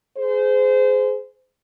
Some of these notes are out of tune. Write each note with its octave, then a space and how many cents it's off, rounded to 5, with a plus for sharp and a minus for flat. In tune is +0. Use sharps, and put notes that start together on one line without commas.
G#4 +15 C5 -25